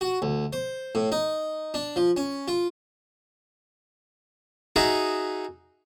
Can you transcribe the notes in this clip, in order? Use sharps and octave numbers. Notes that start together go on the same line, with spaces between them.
F#4
D2
C5
A2
D#4
D4
F3
C#4
F4
D#4 F#4 G#4 E5